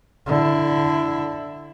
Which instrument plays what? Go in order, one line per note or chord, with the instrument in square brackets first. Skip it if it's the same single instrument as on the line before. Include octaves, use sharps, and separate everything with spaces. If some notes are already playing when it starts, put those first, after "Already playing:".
[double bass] D3 E4